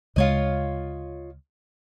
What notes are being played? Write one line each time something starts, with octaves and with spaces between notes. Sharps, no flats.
D2 C#3 G#3 F4 C#5 D#5